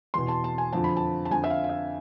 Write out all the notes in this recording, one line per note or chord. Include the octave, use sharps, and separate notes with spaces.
E2 B2 C6
A5
A5
G#5
F2 D3 F3 A5
B5
A5
A5
F2 D3 F3 G#5
E5
F5
F5
E5